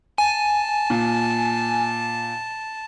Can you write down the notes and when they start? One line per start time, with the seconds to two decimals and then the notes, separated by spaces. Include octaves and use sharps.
0.18 G#5 A5
0.90 A#2